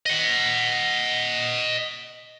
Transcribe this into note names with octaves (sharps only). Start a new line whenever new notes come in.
D#5 F#5